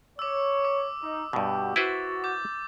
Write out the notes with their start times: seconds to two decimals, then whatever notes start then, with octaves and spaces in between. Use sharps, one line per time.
0.19 C#5 D6 E6
0.65 D6
1.02 D#4
1.33 G2 B2 F#4 G4
1.76 E4 F#4 B4 C5 A6
2.24 D6 G6